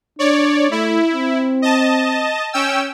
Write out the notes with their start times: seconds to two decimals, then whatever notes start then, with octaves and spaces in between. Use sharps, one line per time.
0.19 D4 C#5 D5
0.71 A3 E4
1.12 C4
1.62 D#5 A5
2.53 C#4 G5 E6